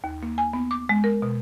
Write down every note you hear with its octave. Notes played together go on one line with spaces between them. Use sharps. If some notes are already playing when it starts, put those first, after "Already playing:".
D#2
A#3
G#5
B3
D6
G#3
A#4
B2